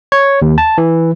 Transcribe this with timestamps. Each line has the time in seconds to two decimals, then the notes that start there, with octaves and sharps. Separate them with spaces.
0.12 C#5
0.42 D#2
0.58 A5
0.78 E3